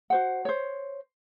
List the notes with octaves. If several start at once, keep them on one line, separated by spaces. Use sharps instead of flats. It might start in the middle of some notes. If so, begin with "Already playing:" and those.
F#4 C5 F#5
C5 C#5